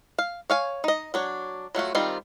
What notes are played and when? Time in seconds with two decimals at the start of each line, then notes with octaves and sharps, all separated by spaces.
0.19 F5
0.50 C#5 F5 G#5
0.84 D#4 D#5
1.14 F#3 D4 C#5
1.75 F#3 A3 F4 F#4
1.95 D#3 G3 C4 F4